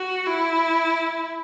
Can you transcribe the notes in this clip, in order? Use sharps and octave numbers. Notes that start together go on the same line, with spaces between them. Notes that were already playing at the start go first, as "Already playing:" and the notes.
Already playing: F#4
E4